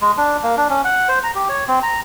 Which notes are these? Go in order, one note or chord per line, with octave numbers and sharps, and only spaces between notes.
G#3
D4
A#3
D4
C#4
F#5
C5
A#5
G4
C#5
C4
A#5